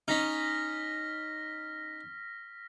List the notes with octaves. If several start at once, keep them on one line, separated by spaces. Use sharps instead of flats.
C#4 D#4 F6 A#6 B6